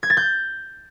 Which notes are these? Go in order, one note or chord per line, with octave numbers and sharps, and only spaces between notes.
G#6
A6
G6